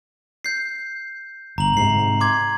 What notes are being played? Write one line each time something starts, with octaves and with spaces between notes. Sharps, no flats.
G6 C7
G1 A#5 F#7
G#2 C3 C7
C6 D6 G#6